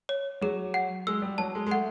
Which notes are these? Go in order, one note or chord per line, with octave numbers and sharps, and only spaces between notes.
C#5
F#3 G#4
F#5
G#3 E6
G3
F#3 A5
G#3
G#3
A3 F#5